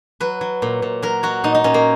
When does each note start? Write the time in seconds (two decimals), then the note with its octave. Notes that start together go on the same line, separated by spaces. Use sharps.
0.20 F#3 B4
0.41 F#3
0.62 A#2
0.82 A#2
1.02 F#3 A#4
1.23 F#3 F#4
1.44 A#2 D#4
1.54 D#4
1.64 A#2 C#4
1.74 A#3